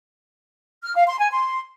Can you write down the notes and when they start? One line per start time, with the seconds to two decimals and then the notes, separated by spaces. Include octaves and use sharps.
0.83 F6
0.95 F5
1.07 C6
1.19 G#5
1.31 C6